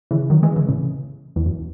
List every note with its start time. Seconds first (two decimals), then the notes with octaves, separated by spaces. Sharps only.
0.11 C#3 E3
0.30 D#3 F#3
0.43 E3 G#3
0.56 C#3 E3
0.69 A2 C#3
1.36 E2
1.46 F#2